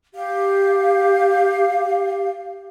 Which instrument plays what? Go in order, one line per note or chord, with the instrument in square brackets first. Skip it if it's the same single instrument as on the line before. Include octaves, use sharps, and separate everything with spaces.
[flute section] G4 F5